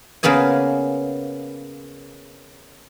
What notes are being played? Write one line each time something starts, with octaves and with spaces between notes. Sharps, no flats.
C#3 A#3 B3 G#4 G#5